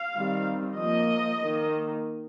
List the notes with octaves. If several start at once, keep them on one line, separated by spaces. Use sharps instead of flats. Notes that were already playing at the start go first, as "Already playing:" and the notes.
Already playing: F5
D#3 G3 C4
F3 A#3 D#5
D#3 A#3